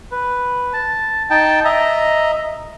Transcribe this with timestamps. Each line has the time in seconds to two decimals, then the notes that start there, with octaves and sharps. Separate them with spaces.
0.11 B4
0.73 A5
1.30 D#4 G5 A5
1.65 D#5 E5 A#5